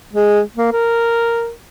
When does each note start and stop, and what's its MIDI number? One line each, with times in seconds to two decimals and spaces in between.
0.13 0.41 56
0.56 0.71 58
0.72 1.50 70